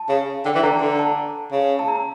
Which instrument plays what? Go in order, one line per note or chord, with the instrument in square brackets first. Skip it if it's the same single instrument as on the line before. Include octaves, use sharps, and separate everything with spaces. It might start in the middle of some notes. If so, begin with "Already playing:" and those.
Already playing: [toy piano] A5
[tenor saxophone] C#3
[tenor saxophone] D3 [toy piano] G5
[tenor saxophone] E3
[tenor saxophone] D3 [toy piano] A#5
[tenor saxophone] D3 [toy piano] A#5
[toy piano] A5
[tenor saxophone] C#3
[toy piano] A5
A#5